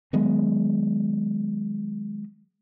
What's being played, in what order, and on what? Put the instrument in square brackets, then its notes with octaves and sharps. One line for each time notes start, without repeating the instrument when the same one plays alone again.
[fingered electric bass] D#3 F#3 G#3 B3